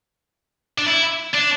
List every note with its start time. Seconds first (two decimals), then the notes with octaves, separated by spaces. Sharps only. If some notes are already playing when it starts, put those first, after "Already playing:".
0.78 D4
0.87 E4
1.34 D4